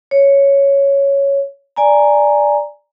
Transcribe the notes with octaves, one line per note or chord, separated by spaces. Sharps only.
C#5
D5 G#5 A#5